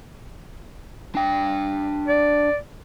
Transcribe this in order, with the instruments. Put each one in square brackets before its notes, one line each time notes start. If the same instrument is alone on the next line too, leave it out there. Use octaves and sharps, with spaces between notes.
[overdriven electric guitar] D4 G5
[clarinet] D5